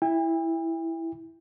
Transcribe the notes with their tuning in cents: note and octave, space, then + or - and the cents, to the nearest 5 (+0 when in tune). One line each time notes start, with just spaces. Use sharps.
E4 +0 G5 +45